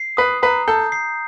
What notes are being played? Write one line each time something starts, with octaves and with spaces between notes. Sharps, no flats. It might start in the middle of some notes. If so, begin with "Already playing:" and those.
Already playing: C7
B4 D#6
B4 A#5
A4 G6
C7